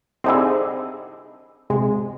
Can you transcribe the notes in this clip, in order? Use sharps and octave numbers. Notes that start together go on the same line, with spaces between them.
C2 D3 C4 D#4 E4 G#4
C3 G#3